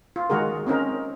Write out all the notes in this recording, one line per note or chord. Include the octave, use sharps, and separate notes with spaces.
F4
D#3 G#3 F#4 G#4 A#4
C4 C#4 D#4 A#4